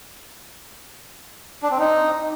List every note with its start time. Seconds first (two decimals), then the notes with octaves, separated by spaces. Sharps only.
1.63 D4
1.71 C4
1.79 D#4